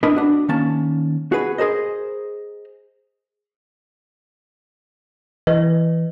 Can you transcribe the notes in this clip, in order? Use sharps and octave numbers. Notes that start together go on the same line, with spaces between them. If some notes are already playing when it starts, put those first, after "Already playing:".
C#4 D4 E4 A#4 B4 D#5
D4 F#4
D#3 A#3 C#4 A5
F#4 G#4 B4
G#4 A#4 C5 D#5
E3 B4 D#5